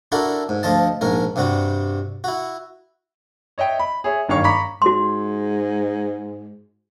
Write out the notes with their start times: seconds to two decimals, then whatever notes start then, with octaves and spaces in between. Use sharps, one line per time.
0.12 D4 E4 F#4 A4 A#4
0.49 G#2
0.63 D2 F3 F4 D#5 A5
1.01 A#1 G#2 C#4 A#4
1.36 G2 C3 G3 F#4
2.24 E4 F#4
3.58 C#5 D#5 E5 G5
3.79 B5
4.04 G#4 C#5 E5
4.28 F#1 G2 D#3 C#5 F5 C#6
4.44 A#5 B5 C#6 D6 B6
4.82 G#2 F#4 C6